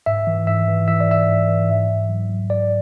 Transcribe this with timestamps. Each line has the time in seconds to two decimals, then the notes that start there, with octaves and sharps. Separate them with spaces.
0.06 G#2 E5
0.27 E3
0.47 G#2 E5
0.68 E3
0.88 E3 E5
1.00 D5
1.08 G#2 E5
1.28 G#2
1.48 E3
1.69 G#2
1.89 G#2
2.09 F#3
2.30 F#3
2.50 G#2 D5